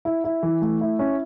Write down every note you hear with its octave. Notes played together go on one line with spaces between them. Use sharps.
E4
E4
E3
A3
E4
C#4